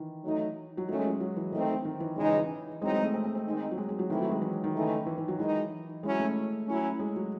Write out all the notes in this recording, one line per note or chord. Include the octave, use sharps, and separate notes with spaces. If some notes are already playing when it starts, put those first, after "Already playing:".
Already playing: D#3 E3
F#3 A3 D#4
F#3
D#3 F#3 A3 C#4
G#3
F#3
F#3
E3
D#3 E3 A3 C4 D#4
D#3
E3
C#3 E3 G#3 D#4
E3
E3
F#3 G#3 C4 D#4
G#3
A3
C4
C4
C4
D#3 G#3 D#4
F#3
G#3
G#3
F#3
D#3 E3 A3 C4 E4
F#3
G#3
E3
D#3
C#3 E3 A3 D#4
E3
E3
F#3
D#3 E3 G#3 D#4
F#3 G#3 C#4 E4
A3
F#3 C#4 E4
G#3
F#3